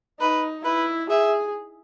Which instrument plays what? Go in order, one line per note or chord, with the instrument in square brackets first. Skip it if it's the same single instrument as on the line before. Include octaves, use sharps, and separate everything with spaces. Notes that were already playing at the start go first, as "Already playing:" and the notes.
[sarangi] D#4 [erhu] B4
[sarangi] E4 [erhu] B4
[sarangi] G#4 [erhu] E5